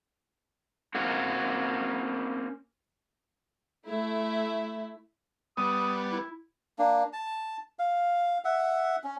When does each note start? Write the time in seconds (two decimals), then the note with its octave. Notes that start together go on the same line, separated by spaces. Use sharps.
0.95 A#3 C4 C#4 F#4
3.86 A3 E4
5.57 G3 B3 D#6
6.12 E4
6.79 A#3 D4
7.13 A5
7.79 F5
8.45 E5 F#5
9.04 C#4